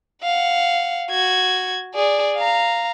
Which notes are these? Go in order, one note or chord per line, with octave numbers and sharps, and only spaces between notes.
F5 F#5
F#4 G#6
G#4 D5
F5 A#5